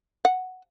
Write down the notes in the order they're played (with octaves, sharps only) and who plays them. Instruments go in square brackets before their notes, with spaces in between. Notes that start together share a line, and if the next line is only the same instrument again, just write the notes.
[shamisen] F#5